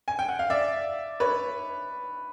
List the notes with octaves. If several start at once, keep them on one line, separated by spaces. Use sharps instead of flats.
G#5
G5
F#5
F5
D5 E5
B4 C#5